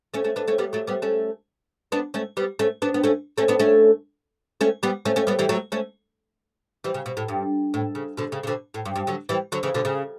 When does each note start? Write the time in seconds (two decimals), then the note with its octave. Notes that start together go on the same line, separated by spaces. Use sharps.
0.14 A3 C#4
0.24 A3 C#4
0.36 B3 D4
0.48 A3 C#4
0.58 G3 B3
0.73 F#3 A3
0.87 G3 B3
1.02 A3 C#4
1.92 B3 D4
2.14 A3 C#4
2.37 G3 B3
2.59 A3 C#4
2.82 B3 D4
2.94 B3
3.04 A3 C#4
3.38 A3 C#4
3.48 B3 D4
3.59 A3 C#4
4.61 A3 C#4
4.83 G3 B3
5.05 A3 C#4
5.16 A3 C#4
5.27 G3 B3
5.39 E3 G3
5.49 F#3 A3
5.72 A3 C#4
6.84 E3 G3
6.94 C#3
7.06 B2
7.17 A2
7.28 G2
7.74 A2
7.95 C#3
8.17 B2 D3
8.32 C#3
8.43 C#3
8.47 B2 D3
8.74 A2
8.85 G2
8.95 G2
9.07 D3 F#3
9.29 E3 G3
9.52 D3 F#3
9.63 C#3 E3
9.74 B2 D3
9.85 C#3